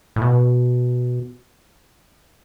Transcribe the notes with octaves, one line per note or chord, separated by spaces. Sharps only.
A2
B2